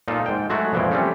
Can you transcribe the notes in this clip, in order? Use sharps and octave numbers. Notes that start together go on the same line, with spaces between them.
A#2 D#4 F4 A4
G#2 G5
F#3 G#3 A3 F#4 C#5
F2 A#2 E3 F3 G#3 G5
G3 A3 C4 C#4